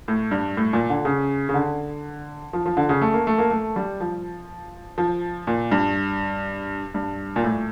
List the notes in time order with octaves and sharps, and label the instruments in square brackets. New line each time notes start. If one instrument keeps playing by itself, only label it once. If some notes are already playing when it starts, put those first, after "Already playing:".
[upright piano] A2
G2
A2
A#2
D3
C#3
C#3
D3
F3
F3
D3
C#3
A3
A#3
A3
A#3
A3
G3
F3
F3
A#2
G2
G2
A#2
A2